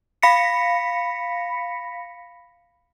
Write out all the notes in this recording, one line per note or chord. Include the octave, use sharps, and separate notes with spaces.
F5 B5 A#6 B6 C#7